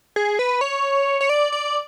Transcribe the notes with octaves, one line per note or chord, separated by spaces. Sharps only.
G#4
B4
C#5
C#5
D5
D5